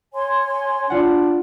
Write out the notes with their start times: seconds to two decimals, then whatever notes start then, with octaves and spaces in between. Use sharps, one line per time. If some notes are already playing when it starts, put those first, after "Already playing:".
0.13 C#5 G#5 C6
0.90 D4 F4 F#5